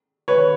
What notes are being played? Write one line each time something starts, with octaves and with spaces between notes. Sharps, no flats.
B4 C#5